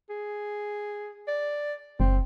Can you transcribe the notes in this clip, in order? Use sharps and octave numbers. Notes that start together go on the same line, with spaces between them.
G#4
D5
F#1 C4